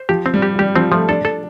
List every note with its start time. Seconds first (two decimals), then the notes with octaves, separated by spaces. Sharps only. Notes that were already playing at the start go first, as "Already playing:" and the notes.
Already playing: C5
0.09 F3 G4
0.26 C4
0.34 G3
0.42 G4
0.59 G3 G4
0.75 F3 C4
0.92 F3 A3
1.08 D4 A4
1.25 A4